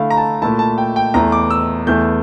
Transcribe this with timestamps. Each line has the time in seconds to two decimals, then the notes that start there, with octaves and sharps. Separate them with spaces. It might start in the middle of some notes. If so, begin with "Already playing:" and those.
Already playing: D3 A3 E4 F5
0.10 A#5
0.17 A5
0.42 A#2 A3 E4 A5
0.59 A5
0.78 G5
0.96 G5
1.14 E2 E3 A3 A#5
1.32 D6
1.50 E6
1.87 E2 E3 A3 G6